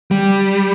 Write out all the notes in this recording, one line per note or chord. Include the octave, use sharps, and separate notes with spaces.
G3